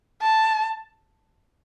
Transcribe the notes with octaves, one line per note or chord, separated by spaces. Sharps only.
A5